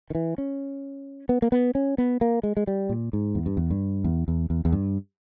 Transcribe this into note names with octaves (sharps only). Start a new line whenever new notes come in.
D#3
E3
C#4
B3
A#3
B3
C#4
B3
A#3
G#3
G#3
G3
A#2
G#2
E2
G2
E2
G2
E2
E2
E2
E2
G2